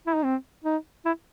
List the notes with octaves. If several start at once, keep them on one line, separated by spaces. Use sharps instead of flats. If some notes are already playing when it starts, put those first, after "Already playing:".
E4
D#4
C4
D#4
E4